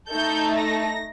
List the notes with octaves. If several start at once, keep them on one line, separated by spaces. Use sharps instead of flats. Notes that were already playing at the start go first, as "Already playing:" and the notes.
A3 D#4 A4 G6
A#6